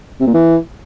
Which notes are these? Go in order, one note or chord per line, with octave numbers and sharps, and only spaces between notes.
C3
A#2
E3